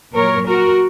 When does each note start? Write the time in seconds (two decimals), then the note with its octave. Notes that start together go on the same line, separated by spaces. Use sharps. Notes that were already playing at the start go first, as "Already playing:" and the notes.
0.13 A#2 F#3 A#4 C#5
0.48 F#4 A#4